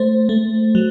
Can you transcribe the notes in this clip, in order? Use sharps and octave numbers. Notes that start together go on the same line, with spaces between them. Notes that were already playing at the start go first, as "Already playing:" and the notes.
Already playing: A3 C5
A3
F#3